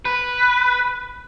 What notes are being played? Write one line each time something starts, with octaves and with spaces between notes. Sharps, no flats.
B4